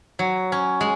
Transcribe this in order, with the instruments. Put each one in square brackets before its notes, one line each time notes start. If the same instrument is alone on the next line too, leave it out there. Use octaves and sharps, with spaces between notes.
[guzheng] F#3
C#4
G#3